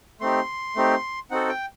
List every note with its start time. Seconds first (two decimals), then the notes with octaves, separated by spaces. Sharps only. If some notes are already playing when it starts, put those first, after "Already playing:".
0.20 A3 C4 D#4 G4 C6
0.76 A3 C4 D#4 G4
1.31 C4 D#4 F#4 A4 F#5
1.49 G5